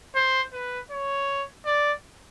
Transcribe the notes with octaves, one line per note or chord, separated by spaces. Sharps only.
C5
B4
C#5
D5